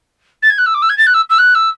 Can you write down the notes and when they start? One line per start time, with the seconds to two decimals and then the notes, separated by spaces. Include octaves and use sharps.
0.43 A6
0.50 G#6
0.58 F#6
0.66 E6
0.74 D6
0.82 E6
0.90 G#6
0.98 A6
1.07 F#6
1.14 E6
1.30 E6
1.39 F#6
1.55 E6